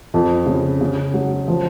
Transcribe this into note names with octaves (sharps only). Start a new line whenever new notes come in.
F2
C#3
C#3
F#3
F3